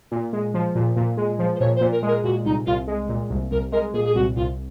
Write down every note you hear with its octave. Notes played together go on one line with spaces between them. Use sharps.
A#2
G#3
F3
A#2
A#2
G#3
F3
C5
A#2 C#5
C5
A#2
A#4
G#3
A#4
A#2 F#4
C2 D#4
C2 F4
G#3
A#2
C2
C2 A#4
G#3 A#4
A#2 G#4
G#4
C2 F#4
C2 F4